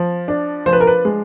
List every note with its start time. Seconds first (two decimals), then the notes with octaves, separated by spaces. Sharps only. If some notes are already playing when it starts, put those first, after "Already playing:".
Already playing: F3
0.28 D4
0.66 F3 C5
0.73 B4
0.80 A#4
0.87 B4
1.05 G#3